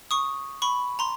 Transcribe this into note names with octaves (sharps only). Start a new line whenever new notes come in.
C#6 D#6
B5 C#6
A#5 C6